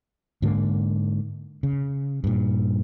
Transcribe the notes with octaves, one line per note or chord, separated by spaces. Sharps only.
G#2 D3 A#3
C#3
G2 A#2